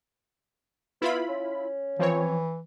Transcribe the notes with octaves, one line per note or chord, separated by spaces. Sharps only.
B3 E4 F4 B5
C#4
E3 F3 C4 C#5